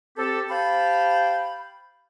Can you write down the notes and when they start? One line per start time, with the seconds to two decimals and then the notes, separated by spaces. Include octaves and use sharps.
0.17 C4 G4 A4
0.49 G4 C5 F5 G5 A5 B5